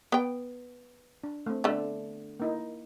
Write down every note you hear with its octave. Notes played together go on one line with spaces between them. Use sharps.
B3 G5
D4
A3 C4
D3 A3 B3 D4
A#3 D#4 E4